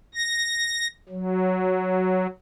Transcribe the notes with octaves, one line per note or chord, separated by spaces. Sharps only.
A#6
F#3